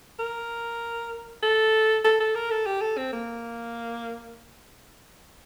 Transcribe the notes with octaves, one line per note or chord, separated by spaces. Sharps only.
A#4
A4
A4
A4
A#4
A4
G4
A4
C4
A#3